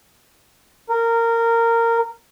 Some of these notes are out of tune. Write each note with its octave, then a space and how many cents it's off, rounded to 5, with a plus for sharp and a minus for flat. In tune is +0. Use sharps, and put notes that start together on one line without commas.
A#4 -15